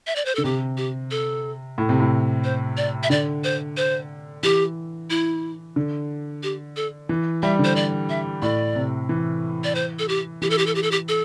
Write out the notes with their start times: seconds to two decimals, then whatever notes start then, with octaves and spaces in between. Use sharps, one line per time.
0.07 E5
0.16 D5
0.25 C5
0.35 D3 A4
0.44 C3 G4
0.77 G4
1.11 A4
1.78 A2
1.89 C3
2.00 A2
2.44 C5
2.77 D5
3.03 E5
3.10 D3 D5
3.44 C5
3.77 C5
4.43 E3 G4
5.10 E4
5.76 D3
6.43 G4
6.77 A4
7.09 E3
7.43 G3 E5
7.59 D3
7.64 C5
7.76 D5
8.09 E5
8.42 A2 D5
8.75 C3
9.09 E3
9.64 D5
9.75 C5
9.99 A4
10.08 G4
10.42 E3 G4
10.50 A4
10.58 G4
10.66 A4
10.75 G4
10.83 A4
10.91 G4
11.08 A4